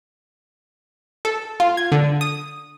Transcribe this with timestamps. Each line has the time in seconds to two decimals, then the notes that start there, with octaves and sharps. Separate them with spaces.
1.25 A4
1.60 F4
1.77 G#6
1.92 D3
2.21 D#6